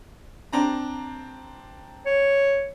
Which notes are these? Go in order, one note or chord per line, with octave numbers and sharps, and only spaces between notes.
C4 D4 A#5
C#5